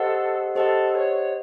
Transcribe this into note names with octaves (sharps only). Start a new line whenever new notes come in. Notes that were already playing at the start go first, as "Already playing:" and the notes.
Already playing: G4 A4 C5 D#5 F#5
G4 A4 C5 D#5 F#5
C#5